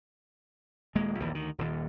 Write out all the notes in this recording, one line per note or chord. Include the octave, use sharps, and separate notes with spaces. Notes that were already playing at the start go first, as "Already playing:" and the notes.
D#1 G#3 A#3
A#1 D#2 E3
D2 D#3
D#1 D#2